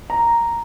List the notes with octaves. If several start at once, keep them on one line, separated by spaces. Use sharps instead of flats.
A#5